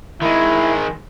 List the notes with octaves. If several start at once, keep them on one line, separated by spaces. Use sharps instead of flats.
D#3 G#3 E4